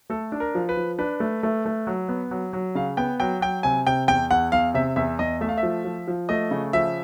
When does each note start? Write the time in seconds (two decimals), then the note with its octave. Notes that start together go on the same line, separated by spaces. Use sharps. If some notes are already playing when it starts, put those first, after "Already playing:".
0.10 A3 A4
0.32 D4
0.40 A#4
0.55 F3
0.69 B4
0.77 F3
0.98 D4 B4
1.20 A3
1.43 A3
1.66 A3
1.87 F#3
2.09 B3
2.31 F#3
2.53 F#3
2.75 C#3 F5
2.97 B3 G5
3.20 F#3 G5
3.41 F#3 G5
3.63 C3 G#5
3.87 C3 G5
4.08 E2 G5
4.31 E2 F#5
4.52 E2 F5
4.74 C3 E5
4.96 E2 E5
5.19 E2 D#5
5.41 A3 E5
5.49 F5
5.58 E5
5.63 F3
5.85 F3
6.08 F3
6.29 A3 D#5
6.51 C#3
6.73 F3 E5